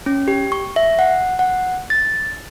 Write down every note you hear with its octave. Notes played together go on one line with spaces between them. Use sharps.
C#4
G4
C#6
E5
F#5
F#5
A6